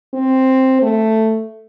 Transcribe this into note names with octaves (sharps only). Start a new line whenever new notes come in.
C4
A3